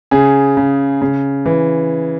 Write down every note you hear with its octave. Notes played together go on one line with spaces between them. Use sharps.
C#3 G#4
C#3
C#3
E3